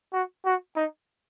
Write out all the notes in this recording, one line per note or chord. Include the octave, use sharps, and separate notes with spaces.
F#4
F#4
D#4